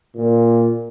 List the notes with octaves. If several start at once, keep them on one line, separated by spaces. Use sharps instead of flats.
A#2